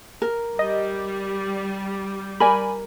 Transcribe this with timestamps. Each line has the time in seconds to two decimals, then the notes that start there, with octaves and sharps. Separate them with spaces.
0.22 A#4
0.59 G3 D#5
2.40 A#4 D5 G#5 B5